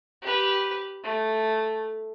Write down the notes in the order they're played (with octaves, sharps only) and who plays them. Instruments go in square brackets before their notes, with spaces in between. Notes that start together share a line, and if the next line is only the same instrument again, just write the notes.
[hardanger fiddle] G4 B4
A3